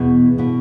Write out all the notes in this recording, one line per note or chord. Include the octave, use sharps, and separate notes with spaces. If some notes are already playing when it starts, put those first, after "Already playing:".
Already playing: E2 B2 B3 E4
B2 B3 E4